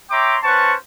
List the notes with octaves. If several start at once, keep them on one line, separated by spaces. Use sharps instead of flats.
C#5 E5 G5 A#5 C6 D6
C#4 B4 C5 F#5 A5 C#6